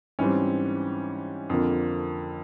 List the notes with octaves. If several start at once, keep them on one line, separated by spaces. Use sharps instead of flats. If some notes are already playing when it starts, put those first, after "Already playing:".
G#2 E3 G3 C4 C#4
F2 D3 F3 A#3